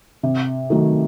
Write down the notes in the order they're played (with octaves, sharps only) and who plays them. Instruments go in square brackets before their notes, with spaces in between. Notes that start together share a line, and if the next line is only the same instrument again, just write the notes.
[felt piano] C3
D#3 F#3 A3